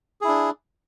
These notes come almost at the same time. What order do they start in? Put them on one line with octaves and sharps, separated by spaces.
G#4 E4 D4